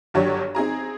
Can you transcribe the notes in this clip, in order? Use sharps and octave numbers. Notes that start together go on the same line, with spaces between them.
G1 G2 F#3 G4 C#5 D5
C4 D#4 G#4 A#5